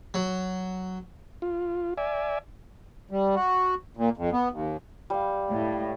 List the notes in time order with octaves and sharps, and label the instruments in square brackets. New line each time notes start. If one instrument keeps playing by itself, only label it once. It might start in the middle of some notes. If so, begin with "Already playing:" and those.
[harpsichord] F#3
[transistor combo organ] F4
D5 E5 G#5
[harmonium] G3
F#4
A#2
F2
B3
D#2
[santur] G3 F5
[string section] A2